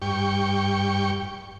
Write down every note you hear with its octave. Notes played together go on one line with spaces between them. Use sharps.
G2 G5 C#6